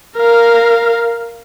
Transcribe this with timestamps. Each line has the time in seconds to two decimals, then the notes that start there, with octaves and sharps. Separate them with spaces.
0.16 A#4 F5